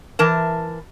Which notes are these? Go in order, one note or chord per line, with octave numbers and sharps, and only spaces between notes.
E3 A#4 A5